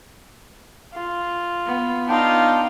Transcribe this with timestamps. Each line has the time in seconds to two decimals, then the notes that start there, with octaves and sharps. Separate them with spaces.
0.93 F4
1.66 B3
2.08 D4 D#4 F4 F5 G5